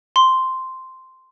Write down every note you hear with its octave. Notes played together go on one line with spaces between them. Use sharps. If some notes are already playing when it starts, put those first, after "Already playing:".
C6